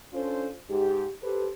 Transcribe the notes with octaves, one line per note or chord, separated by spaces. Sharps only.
C#4 D4 F4 A4 C5
G#2 G4
G4 A4 B4 C5